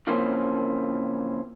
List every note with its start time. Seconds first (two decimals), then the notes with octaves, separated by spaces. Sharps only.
0.07 C#3 E3 F3 A#3 C4 C#4